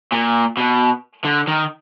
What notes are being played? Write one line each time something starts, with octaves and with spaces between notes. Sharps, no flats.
A#2
B2
D3
D#3